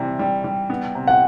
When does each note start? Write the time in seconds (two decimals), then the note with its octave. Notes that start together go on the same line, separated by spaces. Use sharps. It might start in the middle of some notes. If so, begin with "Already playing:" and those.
Already playing: C3 E3 G3
0.19 G3
0.44 G3
0.70 B3
0.95 C3
1.07 F#5